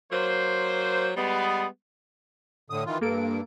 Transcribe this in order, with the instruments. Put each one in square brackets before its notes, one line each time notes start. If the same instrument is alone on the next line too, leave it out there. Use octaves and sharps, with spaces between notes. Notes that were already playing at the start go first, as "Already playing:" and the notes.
[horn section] F#3 A#3 C5
G3 G#3 B3
[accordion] A2 D3 D#6
D#3 E3 F4
[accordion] G2 [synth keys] A#3 A4 D7